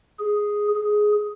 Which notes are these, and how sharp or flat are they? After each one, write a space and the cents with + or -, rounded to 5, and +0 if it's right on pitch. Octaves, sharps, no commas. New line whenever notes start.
G#4 +0
G#4 +10